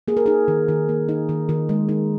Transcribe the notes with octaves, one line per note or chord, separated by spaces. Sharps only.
A#3 G#4
A#4
D#4 G#4
D#3
D#3
A#3
D#4
D#3
D#3
G#3
D#4